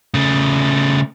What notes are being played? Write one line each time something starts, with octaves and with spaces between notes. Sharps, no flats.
C#3 A3